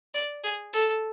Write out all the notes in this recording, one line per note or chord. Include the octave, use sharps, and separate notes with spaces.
D5
G#4
A4